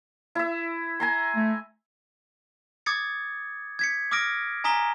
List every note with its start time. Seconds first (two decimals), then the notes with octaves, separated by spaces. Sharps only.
0.35 E4 E5
1.00 G#5 A#5 C6
1.36 A3
2.86 D6 D#6 G#6 A6 C#7
3.79 G#6 B6 C#7
4.11 D6 D#6 F6 A#6 D7
4.64 G#5 A#5 D#6 B6 G7